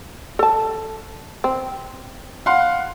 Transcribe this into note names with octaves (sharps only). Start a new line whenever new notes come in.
A4 A5
C4
F5 F#5 C6